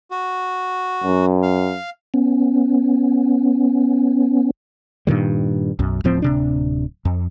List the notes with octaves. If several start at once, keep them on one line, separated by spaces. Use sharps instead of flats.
F#4
F#2
F5
B3 C#4
G2 A#2 D#3 G3
B1 F#2
D1 A2 F3 C4
D1 C3 D4
F2